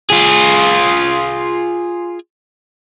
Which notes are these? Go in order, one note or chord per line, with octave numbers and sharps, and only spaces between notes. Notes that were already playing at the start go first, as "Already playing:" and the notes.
F4 G#4